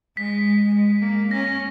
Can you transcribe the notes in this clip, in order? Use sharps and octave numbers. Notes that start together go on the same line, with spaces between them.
G#3 B6
G#3
A#3
C#4 A#6